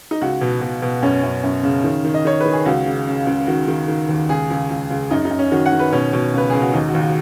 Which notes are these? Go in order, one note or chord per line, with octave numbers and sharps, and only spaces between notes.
D#4
C#2 F#4
B2
B2
B2
F#2 C#4
F#2
F#2
C#3
D#3
D#3
D#5
D#3 C#5
B4
D#3
G#4
C#2 F#4
C#3
C#3
C#2
D#3 F#4
D#3
D#3
D#2
C#2 G#4
C#2
C#2
C#2
F#2 D#4
D#4
F#2
C#4
D#3 F#4
F#5
D#3
B4
B2 C#4
B2
C#2 B4
C#2 G#4
F#4
D#2 D#4
F#4
D#2
F#4